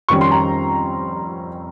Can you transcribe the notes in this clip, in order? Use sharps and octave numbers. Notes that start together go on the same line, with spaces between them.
F2 D#3 G3 C#4 C#6
C6
A#5